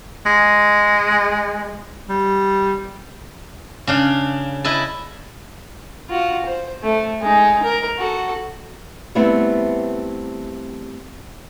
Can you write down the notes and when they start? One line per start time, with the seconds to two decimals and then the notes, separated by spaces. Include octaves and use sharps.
0.26 G#3
2.09 G3
3.87 C#3 D4 F5
4.64 E4 B4 D#5 A5
6.09 F4 F#4
6.45 C5
6.83 A3
7.21 G#3 D#4
7.62 A#4
7.98 F#4 A4
9.15 G3 A3 B3 C4 E4